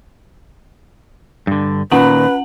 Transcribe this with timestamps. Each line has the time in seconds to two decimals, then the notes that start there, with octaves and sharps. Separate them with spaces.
1.47 G2 D3
1.92 A#2 D#3 C#4 B4 F#5 F#7